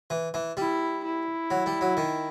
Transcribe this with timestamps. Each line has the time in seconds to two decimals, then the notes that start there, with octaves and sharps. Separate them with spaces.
0.10 E3
0.34 E3
0.57 G3 E4
1.04 E4
1.51 F#3
1.66 G3
1.81 F#3
1.97 D#3